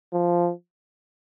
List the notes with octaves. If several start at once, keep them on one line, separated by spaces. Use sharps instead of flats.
F3